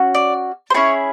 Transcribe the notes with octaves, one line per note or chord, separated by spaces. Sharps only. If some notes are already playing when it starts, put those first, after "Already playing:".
Already playing: C#4 F#4
D5
C5
C#4 E4 G#4 C#5